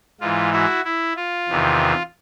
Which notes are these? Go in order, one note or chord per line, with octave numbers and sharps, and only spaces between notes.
G#2 E3 F4
E4 F#4
E4
F4
E2 C3 D#3